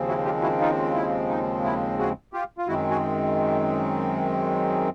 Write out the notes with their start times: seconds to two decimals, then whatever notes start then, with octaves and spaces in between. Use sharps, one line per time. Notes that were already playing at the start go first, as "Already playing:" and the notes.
Already playing: D#2 C#3 F3 G#3 C4
0.08 E4 F#4
0.25 F4 G4
0.42 E4 F#4
0.60 D#4 F4
0.95 E4
1.29 D#4
1.64 E4
1.99 F#4 G#4
2.33 F4 G4
2.58 F4
2.67 F#2 D#3 G#3 C4 E4 F#4
2.90 F#4 G#4